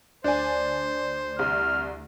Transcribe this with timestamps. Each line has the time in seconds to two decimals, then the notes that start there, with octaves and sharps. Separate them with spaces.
0.24 D2 D4 C5 G#5
1.39 C2 F6